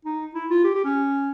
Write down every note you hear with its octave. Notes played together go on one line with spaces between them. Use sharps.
D#4
E4
F4
G4
G4
C#4